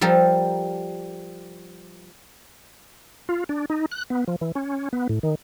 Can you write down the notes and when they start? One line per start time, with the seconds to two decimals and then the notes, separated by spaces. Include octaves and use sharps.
0.01 F3 G3 A4 A#4
3.29 F4
3.49 D4
3.70 D#4
3.91 F#6
4.10 B3
4.28 F3
4.41 E3
4.55 C#4
4.93 B3
5.09 A2
5.23 D#3